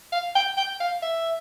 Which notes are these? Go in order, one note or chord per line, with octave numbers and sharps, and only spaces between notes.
F5
G5
G5
F5
E5